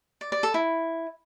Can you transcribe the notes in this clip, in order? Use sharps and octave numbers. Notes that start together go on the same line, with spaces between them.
D5
D5
A4
E4